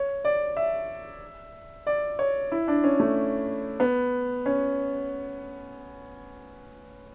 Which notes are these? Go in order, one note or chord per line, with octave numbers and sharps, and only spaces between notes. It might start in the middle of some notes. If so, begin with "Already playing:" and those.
Already playing: C#5
D5
E5
D5
C#5
E4
D4
C#4
A3
B3
C#4